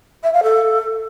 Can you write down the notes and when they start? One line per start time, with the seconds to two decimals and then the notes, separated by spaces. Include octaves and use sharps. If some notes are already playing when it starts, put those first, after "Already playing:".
0.23 E5
0.33 F5
0.43 A4